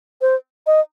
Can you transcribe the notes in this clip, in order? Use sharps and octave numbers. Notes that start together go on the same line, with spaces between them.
C5
D#5